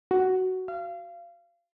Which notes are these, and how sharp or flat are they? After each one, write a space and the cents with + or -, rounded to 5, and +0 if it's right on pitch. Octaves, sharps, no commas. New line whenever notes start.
F#4 +10
F5 -25